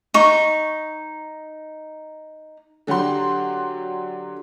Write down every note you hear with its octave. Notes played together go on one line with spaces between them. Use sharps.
D#4 C#6
D3 F#3 F#4 G4 C6